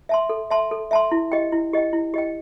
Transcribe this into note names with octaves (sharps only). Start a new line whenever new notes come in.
E5 A5 C6
A4
E5 A5 C6
A4
E5 A5 C6
E4
G4 D#5 G5
E4
G4 D#5 G5
E4
G4 D#5 G5